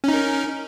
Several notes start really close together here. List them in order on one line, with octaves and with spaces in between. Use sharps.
C#4 D#4 A#4